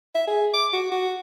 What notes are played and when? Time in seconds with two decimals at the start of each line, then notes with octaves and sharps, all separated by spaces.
0.15 E5
0.27 G#4
0.54 D6
0.73 F#4
0.92 F#4